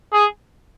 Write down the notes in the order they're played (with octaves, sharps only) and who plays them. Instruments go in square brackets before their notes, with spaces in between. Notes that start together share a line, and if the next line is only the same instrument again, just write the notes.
[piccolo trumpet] G#4